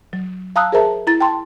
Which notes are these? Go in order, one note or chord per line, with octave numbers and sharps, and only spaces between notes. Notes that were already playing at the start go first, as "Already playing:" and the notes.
F#3
F5 A5 A#5 D#6 E6 F#6
G#4 A#4 C5 E5 A5 A#5
E4 A#5 A6
G5 A5 C6